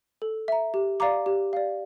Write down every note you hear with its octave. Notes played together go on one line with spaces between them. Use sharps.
A4
E5 A#5
G4
D5 F5 A#5 D6
G4
D5 F5